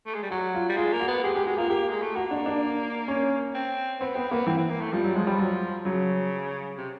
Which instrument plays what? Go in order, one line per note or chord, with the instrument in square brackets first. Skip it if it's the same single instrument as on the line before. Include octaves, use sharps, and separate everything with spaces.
[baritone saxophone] A3
G#3
G3
[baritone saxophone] F#3 [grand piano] F#4
[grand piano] F4
[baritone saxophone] G3
[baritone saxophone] G#3 [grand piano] F4
[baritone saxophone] A#3
[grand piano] F#4
[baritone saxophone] B3
[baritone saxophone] G#3 [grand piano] G4
[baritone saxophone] G#3 [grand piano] G4
[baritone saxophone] G#3 [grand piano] F#4
[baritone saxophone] A#3 [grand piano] F4
[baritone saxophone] A#3 [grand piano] G4
[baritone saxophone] G#3
A3
[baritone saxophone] A#3 [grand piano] F#4
[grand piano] D4
D4
C#4
[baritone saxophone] C4
[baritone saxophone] B3 [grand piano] C4
[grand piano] B3 [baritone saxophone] C4
[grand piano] A#3 [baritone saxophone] B3
[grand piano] E3 [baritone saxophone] C4
[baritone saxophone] C4
A#3
A3
[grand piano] F3 [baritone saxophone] G3
[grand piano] F#3
[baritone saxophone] F3 [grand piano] G#3
[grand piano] G3
F#3
[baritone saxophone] C#3 [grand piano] F#3
[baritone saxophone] C3